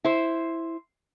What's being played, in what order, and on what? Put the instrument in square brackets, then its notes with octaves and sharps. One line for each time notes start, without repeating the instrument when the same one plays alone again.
[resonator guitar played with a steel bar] E4 C5